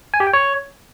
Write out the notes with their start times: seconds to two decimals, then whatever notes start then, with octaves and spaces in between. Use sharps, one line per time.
0.14 G#5
0.20 G4
0.27 G5
0.33 C#5